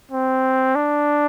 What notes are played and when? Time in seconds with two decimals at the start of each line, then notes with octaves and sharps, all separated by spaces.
0.11 C4
0.75 D4